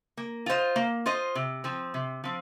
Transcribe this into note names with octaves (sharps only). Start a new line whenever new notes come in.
A#3
F4 C5 D#5
A#3
F4 C5 D#5
C3
F3 C4
C3
F3 C4